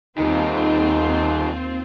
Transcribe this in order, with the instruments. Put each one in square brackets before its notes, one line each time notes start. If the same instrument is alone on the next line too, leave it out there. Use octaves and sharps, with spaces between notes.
[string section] D#2 C4 F4 [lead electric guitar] D#3 G3 [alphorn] D#4